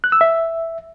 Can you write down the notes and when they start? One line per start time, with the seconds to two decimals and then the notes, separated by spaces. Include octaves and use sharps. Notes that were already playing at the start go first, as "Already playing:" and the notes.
0.04 F#6
0.12 E6
0.21 E5